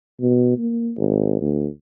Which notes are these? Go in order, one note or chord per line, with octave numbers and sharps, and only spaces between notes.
B2
A#3
G#1
D2